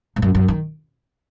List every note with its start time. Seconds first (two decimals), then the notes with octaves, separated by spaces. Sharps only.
0.16 G#2
0.22 F#2
0.35 F#2
0.48 D#3